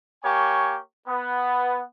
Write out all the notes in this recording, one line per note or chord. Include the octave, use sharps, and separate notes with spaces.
A#3 G4 C#5 G#5 C#6
B3